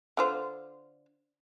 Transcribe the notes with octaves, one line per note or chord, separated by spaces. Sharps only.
D3 F4 C5